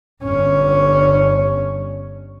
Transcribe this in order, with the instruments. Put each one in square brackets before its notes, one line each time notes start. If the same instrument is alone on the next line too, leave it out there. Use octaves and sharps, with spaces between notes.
[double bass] G1 C#4